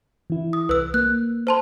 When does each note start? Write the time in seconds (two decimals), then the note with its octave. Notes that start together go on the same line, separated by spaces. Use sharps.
0.30 E3 E4
0.53 D#6
0.69 C2 B4 E6 F#6
0.94 A#3 F#6
1.47 C5 A5 C6